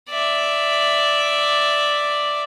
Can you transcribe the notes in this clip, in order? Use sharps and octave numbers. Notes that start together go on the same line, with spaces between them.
D5 E5